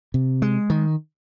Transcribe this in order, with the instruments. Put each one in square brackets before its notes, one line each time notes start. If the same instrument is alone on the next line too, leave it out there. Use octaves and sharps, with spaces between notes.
[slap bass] C3
G#3
D#3